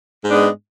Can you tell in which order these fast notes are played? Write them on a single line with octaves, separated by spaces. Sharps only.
G#2 B3 D4 G#3